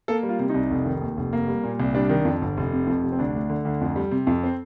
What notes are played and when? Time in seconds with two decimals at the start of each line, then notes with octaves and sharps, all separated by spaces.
0.08 A#3 A4
0.23 G3
0.29 F4
0.39 C3
0.49 D#4
0.54 C2
0.71 F1
0.86 D#3
1.02 D#2
1.17 F1
1.33 A#3
1.48 G3
1.64 A#2
1.80 C2
1.95 G3 D4
2.09 D#3
2.25 F2
2.41 G1
2.57 F1
2.72 C3
2.87 F2
3.03 F1
3.12 C4
3.19 D2 D4
3.35 A3
3.50 D3
3.65 D2
3.81 F2
3.96 G3
4.11 C3
4.27 F2
4.44 C4